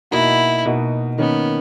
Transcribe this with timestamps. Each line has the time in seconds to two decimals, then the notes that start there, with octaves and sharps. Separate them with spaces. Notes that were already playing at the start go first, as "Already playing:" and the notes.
0.11 B2 A#3 D#4 E4 F#4
0.66 B2 A#3 D#4 F#4
1.18 D#3 A#3 B3 C#4